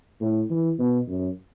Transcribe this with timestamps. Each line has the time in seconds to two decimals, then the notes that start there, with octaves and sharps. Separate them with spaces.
0.21 A2
0.50 E3
0.79 B2
1.08 F#2